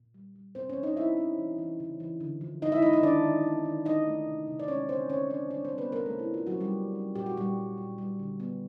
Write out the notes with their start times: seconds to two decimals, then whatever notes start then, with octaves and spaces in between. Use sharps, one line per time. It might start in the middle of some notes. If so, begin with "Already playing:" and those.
Already playing: A#2
0.14 G3
0.36 G3
0.55 C3 C4 C5
0.69 C#4 C#5
0.77 F3
0.83 D#4 D#5
0.97 C#4 E4 E5
1.17 C#4
1.38 E3
1.59 E3
1.80 C#3
2.00 E3
2.20 D3
2.41 F3
2.62 G#3 D#4 D#5
2.72 E4 E5
2.82 G#3 D#4 D#5
2.93 D#4 D#5
3.03 D#3 D4 D5
3.24 D#3
3.44 C#4
3.65 D#3
3.86 D#3 D#4 D#5
4.06 A3
4.27 C3
4.47 C3
4.60 D5
4.68 G#3 C#4 C#5
4.89 D3 C4 C5
5.10 D3 C#4 C#5
5.30 F3 D4 D5
5.51 G3 D4 D5
5.65 C4 C5
5.72 G3
5.78 B3 B4
5.92 C3 A#3 A#4
6.06 A3 A4
6.13 C3
6.19 E4
6.33 A3 F4
6.47 F#3 F#4
6.54 C#4
6.60 G3 G4
6.75 C#4
6.95 C#4
7.15 A#2 G4
7.26 F#4
7.37 A#2 G3 G4
7.57 G3
7.78 A#2
7.98 G3
8.19 D3
8.40 B3